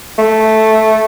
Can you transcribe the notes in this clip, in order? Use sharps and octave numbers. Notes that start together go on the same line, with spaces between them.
A3